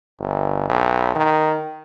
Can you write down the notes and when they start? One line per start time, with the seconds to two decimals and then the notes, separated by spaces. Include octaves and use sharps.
0.19 G1
0.69 B1
1.15 D#3